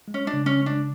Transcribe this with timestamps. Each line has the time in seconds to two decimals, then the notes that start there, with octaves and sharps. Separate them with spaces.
0.08 G#3
0.14 C#4
0.27 D4
0.33 C#3
0.46 C#4
0.60 G#3
0.66 D4